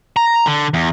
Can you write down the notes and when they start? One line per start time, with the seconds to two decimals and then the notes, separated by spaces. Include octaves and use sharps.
0.17 A#5
0.47 D3
0.74 E2